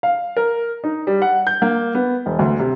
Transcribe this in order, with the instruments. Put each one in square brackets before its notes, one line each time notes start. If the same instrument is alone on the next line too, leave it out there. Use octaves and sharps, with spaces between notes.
[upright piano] F5
A#4
D#4
G3
F#5
G6
A#3
B3
E1
D2
C3